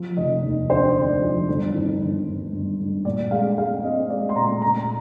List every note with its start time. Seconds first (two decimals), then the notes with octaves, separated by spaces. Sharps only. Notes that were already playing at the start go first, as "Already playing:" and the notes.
Already playing: F3
0.17 F1 D#5
0.43 D#2
0.70 D3 C5
0.89 D5
0.96 D3
1.09 D5
1.22 F3
1.48 G1
1.74 D#3
2.01 G1
2.27 G1
2.52 G1
2.79 G1
3.05 A#2 D5
3.31 G#3 F5
3.58 G#3 F5
3.84 C4 D#5
4.10 G#3 D5
4.29 C6
4.36 A#2 A#5
4.62 A#2 A#5